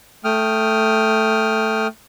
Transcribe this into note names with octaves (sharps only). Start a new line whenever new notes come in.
A3 G5 D#6 F6